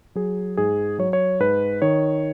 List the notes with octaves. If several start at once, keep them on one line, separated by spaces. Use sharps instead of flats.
F#3 G#4
G#2 G#4
F#3 C#5
C#5
G#2 B4
D#3 C#5